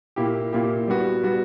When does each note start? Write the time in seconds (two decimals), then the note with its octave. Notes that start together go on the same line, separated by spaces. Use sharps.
0.16 A#2 A#3 E4 G4
0.52 A#2 A#3 E4 G4
0.88 G3 B3 F#4
1.23 G3 B3 F#4